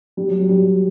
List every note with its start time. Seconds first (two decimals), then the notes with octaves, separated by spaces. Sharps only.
0.17 G3
0.28 F#3
0.39 F#3
0.49 G3